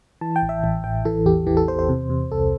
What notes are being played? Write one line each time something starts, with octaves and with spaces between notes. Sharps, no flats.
E3 A5
G5
A1
E5
A1
A1 G5
E3 A4
E2 G4
E3 G4
A4
E2 C5
C5
C3
C3
C2 A4